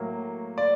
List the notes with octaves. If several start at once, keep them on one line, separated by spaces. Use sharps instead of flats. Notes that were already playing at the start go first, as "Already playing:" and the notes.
Already playing: A2 F#3 A#3
D5